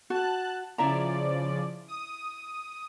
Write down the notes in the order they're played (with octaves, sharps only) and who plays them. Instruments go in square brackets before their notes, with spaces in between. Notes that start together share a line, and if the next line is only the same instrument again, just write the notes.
[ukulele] F#4 [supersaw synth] A5 F#6
[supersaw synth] C#3 F3 D5 [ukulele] E4 E5 A#5
[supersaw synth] D#6